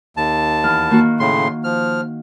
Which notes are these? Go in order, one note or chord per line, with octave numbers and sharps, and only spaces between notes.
D#2 A5
E2 F6
D#3 A#3 F#4
A2 C#3 C6
F3 F6